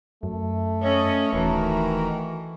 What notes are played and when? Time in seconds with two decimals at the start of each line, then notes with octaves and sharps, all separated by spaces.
0.23 F#2 A3
0.82 C#4 A4 C#5 D#5
1.33 D#1 D#3 E3 F#4 A#4